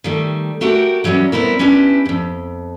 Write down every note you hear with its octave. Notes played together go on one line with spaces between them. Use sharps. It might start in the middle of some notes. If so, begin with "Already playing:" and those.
D#3 G3 A3
A3 F#4 G4 A#4 F#5 G5
E3 F#3 G3 A3 C#4
G3 B3 C4 E4 A#4
C#4 D4 E4 G4 B4
F2 G#2